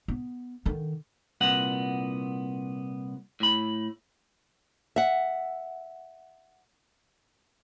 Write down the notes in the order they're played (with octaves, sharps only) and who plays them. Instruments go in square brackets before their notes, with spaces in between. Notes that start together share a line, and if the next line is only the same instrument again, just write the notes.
[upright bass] B3
D3 D#3
[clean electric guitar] C2 A#2 B3 F#5
A2 B5
[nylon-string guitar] E5 F#5